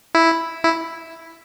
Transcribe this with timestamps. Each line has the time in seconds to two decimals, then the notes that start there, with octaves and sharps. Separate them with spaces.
0.15 E4
0.64 E4